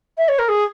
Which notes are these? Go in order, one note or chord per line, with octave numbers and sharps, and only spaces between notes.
E5
C#5
A#4
G#4